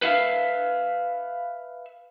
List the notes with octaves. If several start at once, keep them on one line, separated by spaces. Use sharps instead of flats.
B4 E5 F5